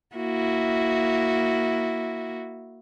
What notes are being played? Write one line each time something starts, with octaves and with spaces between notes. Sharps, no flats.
A#3 E4 F#4